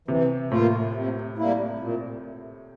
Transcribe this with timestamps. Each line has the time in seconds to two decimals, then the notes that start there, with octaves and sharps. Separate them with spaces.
0.08 C3 E3
0.51 A2 A#3 F4
0.94 C3
1.38 G3 A#3 E4
1.80 A#2